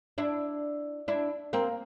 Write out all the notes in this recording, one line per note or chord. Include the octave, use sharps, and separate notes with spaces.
D4 E4
D4 E4
A#3 C4